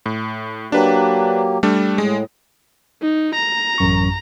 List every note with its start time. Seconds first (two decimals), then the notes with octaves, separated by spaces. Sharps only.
0.06 A2
0.72 F#3 A#3 D4 G4 B4
1.63 G3 A3 D4
1.98 A2 G#3
3.02 D#4
3.35 A#5
3.78 A1 F#2 C#6